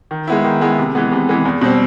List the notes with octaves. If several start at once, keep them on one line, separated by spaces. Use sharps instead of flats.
D#3
G#3 B3 E4
D#3
G#3 B3 E4
C3
E3 G#3 B3
C3
E3 G#3 B3
E2
B2 G3 C4